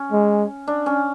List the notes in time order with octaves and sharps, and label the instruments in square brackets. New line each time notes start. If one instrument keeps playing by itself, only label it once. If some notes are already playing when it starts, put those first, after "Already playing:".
Already playing: [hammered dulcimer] C#4
[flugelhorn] G#3
[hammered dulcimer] D4
C#4